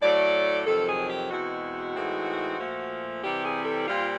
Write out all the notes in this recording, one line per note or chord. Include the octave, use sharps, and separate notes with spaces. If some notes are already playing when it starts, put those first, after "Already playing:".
A2 F#3 A3 D5
F2 C3 D#3 F#3 A4
G#4
G4
E2 B2 G#3 C4 F#4
A2 E3 G#3 C4 D#4
A#2 F3 A3
C3 E3 G3 C4 E4 G4
G#4
A4
A#2 G3 C4 F4